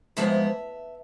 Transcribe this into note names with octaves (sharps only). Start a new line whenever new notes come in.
G#2 F3 G#3 B3 E5